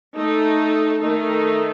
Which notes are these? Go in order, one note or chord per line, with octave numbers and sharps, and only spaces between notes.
A3 D#4 A4
D#3 A3 D#4